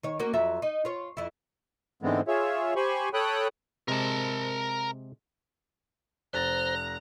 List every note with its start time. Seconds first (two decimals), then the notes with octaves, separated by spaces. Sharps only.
0.03 D#3 C#5
0.20 A#3 C#4 F#4
0.33 F2 F#3 E5
0.62 D#4
0.85 F4 C#5
1.17 F2 E4
2.02 G#2 D3 E3 G#3 B3 C4
2.28 F4 G#4 C#5 E5
2.76 G4 C5 G#5 B5 C#6
3.14 A4 C#5 G5 B5 D#6 F#6
3.88 C3 G#3 A#4 A5
6.33 F1 C5 A#5 F#6 A6